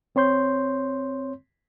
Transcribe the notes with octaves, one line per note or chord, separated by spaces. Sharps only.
D2 C4 C#5 C6 G6